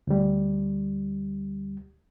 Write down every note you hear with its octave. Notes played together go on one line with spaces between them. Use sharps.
D2 G3